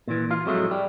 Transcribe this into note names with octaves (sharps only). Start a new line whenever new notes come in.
A#2 E3
F4 F5
F2 A2 F#3 G#3 A3
G3